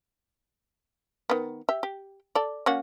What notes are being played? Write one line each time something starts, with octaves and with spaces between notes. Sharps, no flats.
D#3 B3
G4 E5
G4
A4 D5
A#3 C#4 F#4